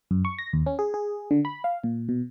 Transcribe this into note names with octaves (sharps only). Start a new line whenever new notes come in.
F#2
C#6
A#6
D#2
C#4
G#4
G#4
D3
B5
F5
A#2
B2